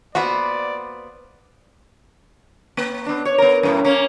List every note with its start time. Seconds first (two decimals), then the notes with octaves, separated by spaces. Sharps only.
0.15 A#3 B3 F#4 B4 C5 D5
2.77 A#3
3.06 B3 D4
3.25 C#5
3.38 B3 A#4
3.63 F#2 A2
3.85 A#3 C#4